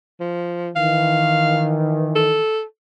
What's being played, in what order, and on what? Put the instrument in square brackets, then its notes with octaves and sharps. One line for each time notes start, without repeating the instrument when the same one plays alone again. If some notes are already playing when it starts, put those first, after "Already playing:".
[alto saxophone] F3
[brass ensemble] D#3 E3 [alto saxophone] F5
[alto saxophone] A4